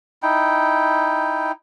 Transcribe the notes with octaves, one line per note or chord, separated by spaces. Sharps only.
D#4 E4 G5